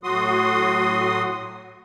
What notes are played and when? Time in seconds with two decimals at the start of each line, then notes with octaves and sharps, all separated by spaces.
0.03 A2 F#3 F#4 C6 D#6